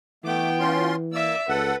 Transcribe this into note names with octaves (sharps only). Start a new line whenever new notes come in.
E3 A3 B3 G5 D6
C#4 F4 C6
A#3 D5 E5 E6
C#2 A4 B4 F#5